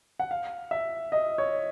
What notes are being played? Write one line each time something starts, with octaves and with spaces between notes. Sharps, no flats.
F#5
F5
E5
D#5
C#5